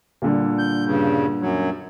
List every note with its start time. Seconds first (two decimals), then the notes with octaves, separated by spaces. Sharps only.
0.22 A#2 D3 G3
0.59 G6
0.86 G2 C#3
1.41 F#2 F#3